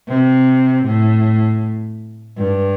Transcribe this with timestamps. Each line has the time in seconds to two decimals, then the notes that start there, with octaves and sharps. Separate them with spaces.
0.08 C3
0.85 A2
2.37 G2